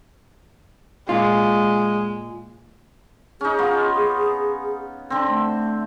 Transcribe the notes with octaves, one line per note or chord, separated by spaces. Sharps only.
A#2 G#3 F4
C#4 D#4 G#4
B3 F4
D3 C4
A3